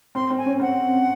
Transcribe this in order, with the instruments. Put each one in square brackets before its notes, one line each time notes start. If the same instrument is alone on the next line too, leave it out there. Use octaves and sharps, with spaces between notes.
[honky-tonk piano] C4 [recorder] C6
[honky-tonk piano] C4
[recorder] G#5
[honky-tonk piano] C#4
[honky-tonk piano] C4 [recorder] F#5